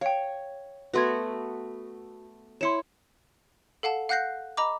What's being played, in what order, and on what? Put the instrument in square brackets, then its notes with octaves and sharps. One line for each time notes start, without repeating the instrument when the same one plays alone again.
[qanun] C#5 [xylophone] F5 G5
[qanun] A3 B3 F#4 [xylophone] B4 C6 G#6
[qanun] E4 C#5 [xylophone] C6 C#7 E7
[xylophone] A4 F5 F#5 A5
F5 F#5 F#6 G6 A#6 C7
D#5 A#5 B5 D6